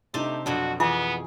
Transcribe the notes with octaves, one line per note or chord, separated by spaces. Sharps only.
C3 A3 D4 D#4 G4
F2 B2 F#3 D4 F#4
E3 B3 F4 G#4 G#5 D6